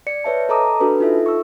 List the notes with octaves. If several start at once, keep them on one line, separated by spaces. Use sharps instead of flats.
D5 C#7
B4 C#5 E5 A5
A4 D#5 A5 A#5 D6 D#6
D4 F#4 A4 B4
D#4 F4 A4 E5
C#6 E6